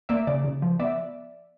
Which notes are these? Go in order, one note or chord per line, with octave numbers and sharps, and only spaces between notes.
A#3 D5 E5
C#3 D5
C#3
F3
B3 D5 E5